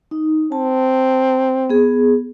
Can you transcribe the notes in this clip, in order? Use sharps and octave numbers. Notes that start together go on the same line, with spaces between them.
D#4
C4 A5
B3 G#4